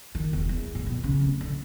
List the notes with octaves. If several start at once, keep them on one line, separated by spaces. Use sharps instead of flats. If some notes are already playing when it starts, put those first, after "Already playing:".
D#3
E1
E2
A2
B2
C#3
D1
D3